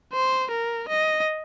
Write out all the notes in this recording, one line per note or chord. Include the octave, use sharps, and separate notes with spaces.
C5
A#4
D#5